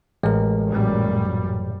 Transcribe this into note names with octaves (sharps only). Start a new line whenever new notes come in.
A1 G#3 A#4
F#2 A#2 G3